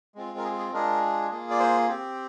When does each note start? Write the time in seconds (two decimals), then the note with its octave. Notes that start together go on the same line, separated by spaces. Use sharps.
0.15 G#3 C4 F4
0.38 A#4
0.44 G#4
0.59 G#4
0.73 G#3 D4 F4 G#4 A#4
1.31 A#3 F4 G#4
1.51 D5
1.60 C5
1.88 C4 G4